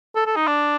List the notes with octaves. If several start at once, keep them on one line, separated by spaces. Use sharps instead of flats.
A4
A4
D#4
D4